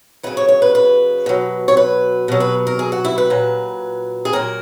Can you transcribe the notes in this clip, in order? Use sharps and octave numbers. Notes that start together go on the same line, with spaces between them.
C#3 F#3 B4
C#5
C#5
B4
B4
B2 F#3
C#5
B4
B2 F#3
B4
A#4
G#4
F#4
E4
B4
A#2 F#3
G#4
A#2 F#3 A#4